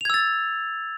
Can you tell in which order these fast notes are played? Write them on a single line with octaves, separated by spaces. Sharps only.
F7 G#6 E6 A6